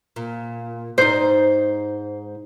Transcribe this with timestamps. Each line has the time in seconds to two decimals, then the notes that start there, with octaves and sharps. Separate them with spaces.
0.16 A#2
0.98 G#2 D#4 C5